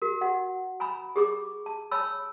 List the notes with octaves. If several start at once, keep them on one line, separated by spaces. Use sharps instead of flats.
F#4 A#4
F#4 F#5
G#5 A#5 B5
G4 G#4 D6
A5
C#5 G#5 A5 B5 E6